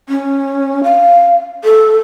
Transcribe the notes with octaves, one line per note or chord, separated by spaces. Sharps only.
C#4
F5
A4